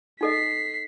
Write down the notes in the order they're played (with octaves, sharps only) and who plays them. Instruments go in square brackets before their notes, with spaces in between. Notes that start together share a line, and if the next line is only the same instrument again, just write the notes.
[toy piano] D#4 A4 D#5 [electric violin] B6 C7